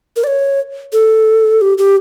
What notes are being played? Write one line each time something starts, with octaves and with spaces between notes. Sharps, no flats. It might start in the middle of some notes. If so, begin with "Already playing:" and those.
A#4
D5
C#5
A4
G4
G4